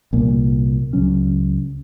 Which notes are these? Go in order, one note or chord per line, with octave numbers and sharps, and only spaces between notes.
C2 A#2 F3 A#3
C#2 C#3 F#3 C#4